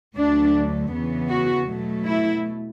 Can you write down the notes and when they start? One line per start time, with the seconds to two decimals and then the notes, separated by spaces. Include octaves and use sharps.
0.15 D2 D3 F#3 A3 D4
0.92 E2 C#3 E3 B3
1.29 F#4
1.69 B2 F#3 A3
2.06 E4